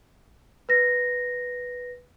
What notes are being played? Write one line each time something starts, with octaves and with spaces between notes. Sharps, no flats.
B4 A#6